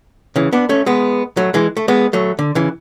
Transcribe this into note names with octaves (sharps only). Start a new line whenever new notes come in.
C#3 E3
B3 D4
A3 C#4
G#3 B3
F#3 A3
E3 G#3
A3
G#3 B3
F#3 A3
D3
C#3 E3